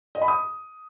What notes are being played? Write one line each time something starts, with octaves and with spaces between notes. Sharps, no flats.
D#5
B5
D#6